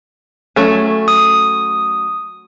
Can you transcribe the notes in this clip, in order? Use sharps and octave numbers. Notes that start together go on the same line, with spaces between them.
F#3 A3 C#4
D#6